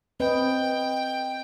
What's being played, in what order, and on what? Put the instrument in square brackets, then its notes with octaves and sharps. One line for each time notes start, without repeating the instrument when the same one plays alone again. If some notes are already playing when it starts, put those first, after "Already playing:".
[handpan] C4 B4 D#5 [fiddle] G5